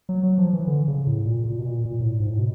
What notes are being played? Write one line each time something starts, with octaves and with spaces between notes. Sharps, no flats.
F#3
F#3
F3
E3
D3
C#3
A2
A#2
A#2
B2
A#2
A#2
A2
G#2
A2
B2